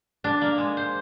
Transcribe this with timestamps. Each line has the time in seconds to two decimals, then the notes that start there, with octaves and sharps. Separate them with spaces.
0.24 D4
0.41 A#3
0.58 G#3
0.77 C5